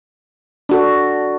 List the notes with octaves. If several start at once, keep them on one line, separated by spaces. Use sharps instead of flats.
D4 F#4 A4